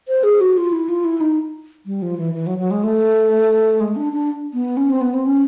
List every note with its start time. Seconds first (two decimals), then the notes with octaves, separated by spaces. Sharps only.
0.08 C5
0.23 G#4
0.41 F#4
0.57 F4
0.72 E4
0.89 F4
1.05 E4
1.21 D#4
1.86 G3
2.02 F3
2.18 E3
2.35 E3
2.47 F#3
2.59 F#3
2.71 G#3
2.84 A3
3.80 G#3
3.96 D4
4.13 D4
4.53 B3
4.77 C#4
4.90 C4
5.01 B3
5.14 C4
5.26 C#4